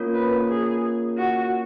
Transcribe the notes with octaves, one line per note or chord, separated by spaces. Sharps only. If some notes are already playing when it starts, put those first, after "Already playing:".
Already playing: A#3 C#4 F4 A#4 C#5
B4
G#4
F#4